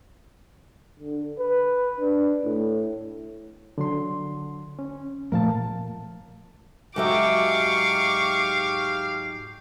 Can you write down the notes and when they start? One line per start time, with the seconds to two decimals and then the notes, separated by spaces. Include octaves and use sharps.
1.00 D3
1.39 B4
2.01 D4
2.44 A2
3.78 D3 F#3 C6
4.79 C#4
5.32 A#2 F3 A3 A#4 F5 A5
6.96 G#2 F#3 G4 E5 F5 C#6 D6